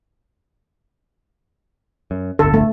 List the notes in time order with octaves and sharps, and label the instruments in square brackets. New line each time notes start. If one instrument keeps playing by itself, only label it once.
[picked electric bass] F#2
[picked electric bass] D1 G1 D3 [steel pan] A4
[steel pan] A3